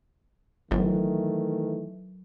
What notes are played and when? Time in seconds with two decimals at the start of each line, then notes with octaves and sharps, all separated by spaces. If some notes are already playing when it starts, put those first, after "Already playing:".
0.71 G1 D#3 E3 F#3 A3